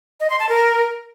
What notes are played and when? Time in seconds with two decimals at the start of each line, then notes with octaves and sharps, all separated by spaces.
0.20 D#5
0.30 C6
0.40 A5
0.49 A#4